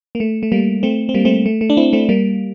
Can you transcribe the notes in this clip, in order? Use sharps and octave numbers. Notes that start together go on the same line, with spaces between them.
A#3
A3
A3
G3 A#3
A3 C4
C4
G3 A#3
A3 C4
A3
A3
D4
C4 E4
A3 C4
G3 A#3